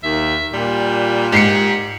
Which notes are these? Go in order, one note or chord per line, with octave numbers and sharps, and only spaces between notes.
D#2 E5
A#2 G3
G#2 G4 C7 C#7